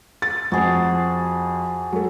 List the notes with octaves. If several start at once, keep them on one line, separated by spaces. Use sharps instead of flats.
A6
F2 F#4 G#4 C5
F#3 A4